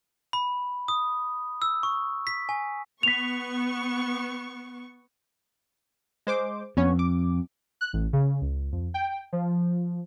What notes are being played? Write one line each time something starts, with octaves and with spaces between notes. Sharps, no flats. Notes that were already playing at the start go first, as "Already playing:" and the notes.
B5
D#6
E6
C#6
B6
G#5
B3 C#6 B6 F7
G#3 C5 D6
F2 B3 C#4 C#5
D6
F#6
A1
C#3
C#2
F2
G5
F3